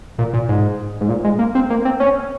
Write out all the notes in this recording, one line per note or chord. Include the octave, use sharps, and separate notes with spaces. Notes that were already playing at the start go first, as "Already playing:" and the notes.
A#2
A#2
G#2
G#2
A#2
G#3
A#3
C4
A#3
C4
C#4